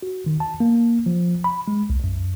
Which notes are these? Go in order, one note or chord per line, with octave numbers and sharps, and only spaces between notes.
F#4
D#3
A5
A#3
F3
B5
G#3
C2
F#2